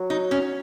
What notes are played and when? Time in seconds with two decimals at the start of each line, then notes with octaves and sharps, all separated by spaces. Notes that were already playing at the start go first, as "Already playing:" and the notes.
Already playing: F#3
0.10 D#4
0.31 C#4